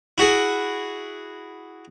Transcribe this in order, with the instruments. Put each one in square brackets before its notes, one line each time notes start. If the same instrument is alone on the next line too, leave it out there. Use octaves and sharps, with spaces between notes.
[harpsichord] E4 F#4 G#4